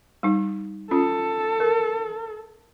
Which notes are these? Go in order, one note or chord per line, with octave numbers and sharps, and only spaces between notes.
G3 D#4
C#4 F4 A4
A#4